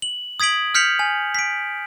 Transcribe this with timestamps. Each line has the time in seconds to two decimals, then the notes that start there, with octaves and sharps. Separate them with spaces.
0.02 F#7
0.40 D#6 G#6 B6 D7 F#7
0.74 F6 G6 B6 C#7 F7 F#7
0.99 G#5
1.35 B6 D7